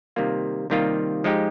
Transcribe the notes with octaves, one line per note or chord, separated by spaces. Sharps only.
C3 D#3 G3 A#3 F4
C3 D#3 G3 A#3 F4
F3 G#3 D#4 G4